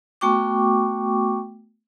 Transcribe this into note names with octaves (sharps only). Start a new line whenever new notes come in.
A3 B3 F#4 G5 C#6 D6